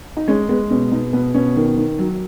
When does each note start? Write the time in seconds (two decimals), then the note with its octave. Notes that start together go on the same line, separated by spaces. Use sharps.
0.17 D#4
0.28 G#3 C#4
0.49 G#3 B3
0.71 B2 C#4
0.92 B2 D#4
1.13 B2 B3
1.34 B2 C#4
1.56 D#3
1.77 D#3
1.99 F#3